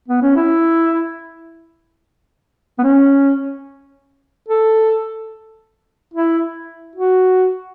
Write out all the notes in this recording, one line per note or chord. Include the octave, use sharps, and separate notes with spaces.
B3
C#4
E4
B3
C#4
A4
E4
F#4